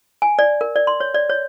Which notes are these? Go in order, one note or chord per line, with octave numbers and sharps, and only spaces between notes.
G#5
D5
A#4
D5
C6
C#5
D5
C#5